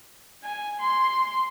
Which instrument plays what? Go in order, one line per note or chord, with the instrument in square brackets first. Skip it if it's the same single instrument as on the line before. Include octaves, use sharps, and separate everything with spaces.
[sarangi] G#5
C6